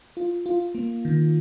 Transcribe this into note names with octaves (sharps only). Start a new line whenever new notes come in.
F4
F4
A#3
D#3